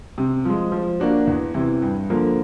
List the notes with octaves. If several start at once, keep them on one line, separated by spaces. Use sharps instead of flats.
C3
F3 G#3
F3
A#3 D4 F#4
E2
C3 E3
G2
D3 F3 A#3